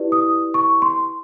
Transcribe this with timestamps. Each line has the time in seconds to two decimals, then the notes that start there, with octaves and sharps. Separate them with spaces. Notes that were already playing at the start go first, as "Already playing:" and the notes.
Already playing: E4 G4 B4 D5
0.12 D#6
0.54 C#6
0.82 C6